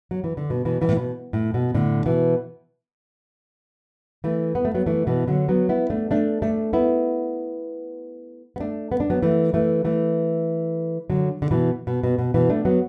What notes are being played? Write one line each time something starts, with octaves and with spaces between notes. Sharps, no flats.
F#3
E3
D3
B2
B2 E3
B2 E3
A2
B2
A2
B2
A2 D3
B2 E3
E3 A3
B3
A3
F#3 B3
E3 A3
B2 E3
D3 F#3
F#3 B3
B3 E4
A3 D4
A3 D4
A3 D4
B3 E4
B3
A3 D4
B3
D4
F#3 B3
E3 A3
E3 A3
E3 A3
D3 F#3
D3
B2 E3
B2
B2
B2
B2 E3
A3 D4
F#3 B3